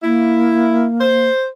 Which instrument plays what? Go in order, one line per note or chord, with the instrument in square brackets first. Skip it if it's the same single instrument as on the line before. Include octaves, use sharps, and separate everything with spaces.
[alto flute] A#3 [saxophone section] E4
[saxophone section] C5